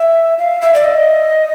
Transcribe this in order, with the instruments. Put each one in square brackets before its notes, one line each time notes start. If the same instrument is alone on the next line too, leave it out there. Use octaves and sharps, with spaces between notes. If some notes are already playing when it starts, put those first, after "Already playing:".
Already playing: [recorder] E5
F5
E5
D5
D#5